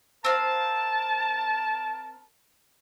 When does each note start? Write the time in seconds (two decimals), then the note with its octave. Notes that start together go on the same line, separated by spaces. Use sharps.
0.24 C4 A#4 F5 A5